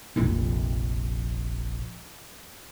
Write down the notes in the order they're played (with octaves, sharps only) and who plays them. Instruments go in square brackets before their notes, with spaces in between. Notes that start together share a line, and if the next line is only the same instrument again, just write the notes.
[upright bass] F1 A#1